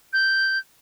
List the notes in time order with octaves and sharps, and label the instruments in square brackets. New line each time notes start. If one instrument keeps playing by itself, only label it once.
[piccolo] G6